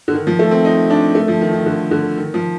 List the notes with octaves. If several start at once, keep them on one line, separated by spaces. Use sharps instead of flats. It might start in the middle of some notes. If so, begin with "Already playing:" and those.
D3
D#3
F3
A3
C4
D#4
D4
A3
F3
D#3
D#3
D3
D3
D#3
F3